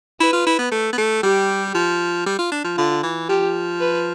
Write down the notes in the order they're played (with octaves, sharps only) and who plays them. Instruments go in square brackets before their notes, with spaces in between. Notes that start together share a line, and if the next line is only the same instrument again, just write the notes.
[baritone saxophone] E4 [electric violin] B4
[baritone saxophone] F4
E4
B3
A3
B3
A3
[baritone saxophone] G3 [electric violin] G4
[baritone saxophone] F3
G3
F4
D4
F3
[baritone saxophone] D3 [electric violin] F4
[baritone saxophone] E3
[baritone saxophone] F3 [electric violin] G4
[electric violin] B4